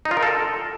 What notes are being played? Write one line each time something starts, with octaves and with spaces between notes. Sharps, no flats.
D#4
F4
A#4
A4